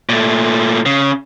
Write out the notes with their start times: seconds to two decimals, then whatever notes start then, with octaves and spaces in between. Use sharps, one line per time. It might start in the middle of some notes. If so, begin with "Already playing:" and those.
0.09 A#2 A3
0.86 C#3